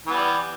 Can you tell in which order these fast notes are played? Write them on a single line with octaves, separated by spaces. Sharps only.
E3 B3 G3